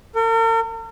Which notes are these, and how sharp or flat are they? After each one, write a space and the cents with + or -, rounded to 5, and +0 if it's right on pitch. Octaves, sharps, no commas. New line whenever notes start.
A#4 -45